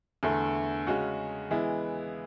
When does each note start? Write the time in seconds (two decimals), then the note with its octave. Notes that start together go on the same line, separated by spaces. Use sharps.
0.23 E2 D3 A3
0.87 C#3 G#3 C#4 F#4
1.51 E3 G#3 B3 E4